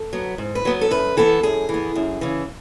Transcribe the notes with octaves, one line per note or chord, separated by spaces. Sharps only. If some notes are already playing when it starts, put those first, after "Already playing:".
Already playing: A4
F#3 B3
G#2
B4
F#3 B3
A4
F#2 B4
E3 B3 A4
F#2 G#4
E3
B3
F#2
C#3 E3